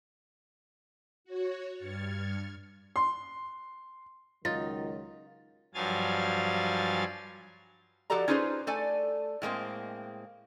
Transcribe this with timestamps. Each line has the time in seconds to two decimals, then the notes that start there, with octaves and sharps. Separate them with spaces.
1.24 F#4 C#5
1.76 G2 F6 G#6 A6 C#7
2.96 C6
4.45 C#2 D#3 F#3 D#4 F4 A6
5.74 G2 F3 F#3 F5 G#5 A6
8.10 F3 F#4 G4 A4 D5 A#5
8.28 C#4 D#4 F4 G#4 B4 C5
8.67 A3 A4 D5 G#5
9.42 A2 G#3 A#3 C4